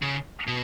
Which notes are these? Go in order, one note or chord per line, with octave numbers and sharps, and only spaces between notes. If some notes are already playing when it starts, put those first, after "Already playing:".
C#3
B2